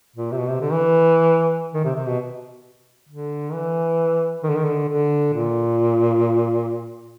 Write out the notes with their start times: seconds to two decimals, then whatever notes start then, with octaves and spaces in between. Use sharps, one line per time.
0.16 A#2
0.32 C3
0.38 B2
0.49 C3
0.61 D3
0.72 E3
1.74 D#3
1.85 C3
1.96 C3
2.08 B2
3.09 D3
3.52 E3
4.43 D#3
4.50 D3
4.57 D#3
4.65 D3
4.88 D3
5.33 A#2